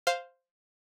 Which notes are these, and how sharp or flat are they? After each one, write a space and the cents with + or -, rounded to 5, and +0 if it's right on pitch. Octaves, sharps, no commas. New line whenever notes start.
C5 +0 F5 +0